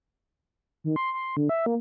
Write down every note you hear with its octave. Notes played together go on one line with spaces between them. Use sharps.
D#3
C6
C6
D3
E5
A#3